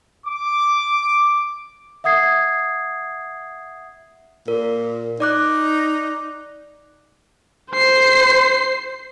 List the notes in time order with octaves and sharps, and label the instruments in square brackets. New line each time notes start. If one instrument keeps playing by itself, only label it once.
[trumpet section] D6
[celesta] E5 F#5 D#6 G#6 C7
[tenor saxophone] A#2 [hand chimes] A#4
[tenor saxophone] D#4 [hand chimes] D5 D6 F#6
[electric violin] C5 C7